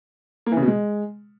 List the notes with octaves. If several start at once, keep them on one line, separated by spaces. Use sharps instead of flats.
A#3
E3
C#3
B2
G#3